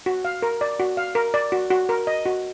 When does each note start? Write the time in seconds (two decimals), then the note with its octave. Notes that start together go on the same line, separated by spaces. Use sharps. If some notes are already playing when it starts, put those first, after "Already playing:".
0.06 F#4
0.25 F5
0.42 A#4
0.61 D5
0.80 F#4
0.97 F5
1.15 A#4
1.34 D5
1.52 F#4
1.71 F#4
1.89 A#4
2.07 D#5
2.26 F#4